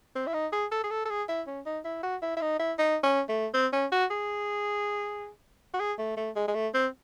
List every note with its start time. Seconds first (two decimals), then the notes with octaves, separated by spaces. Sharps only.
0.15 C4
0.27 E4
0.34 D#4
0.52 G#4
0.72 A4
0.84 G#4
0.90 A4
1.05 A4
1.10 G#4
1.29 E4
1.47 C#4
1.66 D#4
1.85 E4
2.03 F#4
2.22 E4
2.37 E4
2.41 D#4
2.59 E4
2.78 D#4
3.03 C#4
3.29 A3
3.54 C4
3.73 C#4
3.92 F#4
4.10 G#4
5.74 F#4
5.80 G#4
5.98 A3
6.17 A3
6.36 G#3
6.48 G#3
6.55 A3
6.74 C4